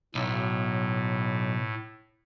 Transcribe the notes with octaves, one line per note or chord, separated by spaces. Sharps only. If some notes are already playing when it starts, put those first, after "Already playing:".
B1 A2